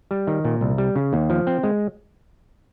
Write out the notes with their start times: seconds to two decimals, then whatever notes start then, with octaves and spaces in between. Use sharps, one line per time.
0.11 G3
0.27 D#3
0.45 A#2
0.61 C2
0.78 G3
0.96 C#3
1.13 D#2
1.30 F3
1.47 C4
1.63 G#3